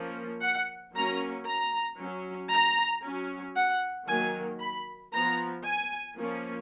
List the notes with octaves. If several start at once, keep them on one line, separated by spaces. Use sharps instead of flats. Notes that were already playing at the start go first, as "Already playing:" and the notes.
Already playing: F3 A#3 C#4
F#5
F#3 A#3 C#4 A#5
A#5
F#3 C#4
A#5
F#3 C#4
F#5
D#3 F#3 A#3 G#5
B5
F3 B3 A#5
G#5
F3 A#3 C#4